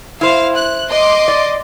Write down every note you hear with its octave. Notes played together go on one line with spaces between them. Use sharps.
E4 C5 F5
F#6
D#5 C6 D6
D5